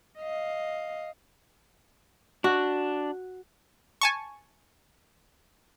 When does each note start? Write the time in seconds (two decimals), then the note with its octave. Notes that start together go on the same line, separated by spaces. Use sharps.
0.19 D#5 F5
2.44 D4 F#4
4.01 G#5 A5 C#6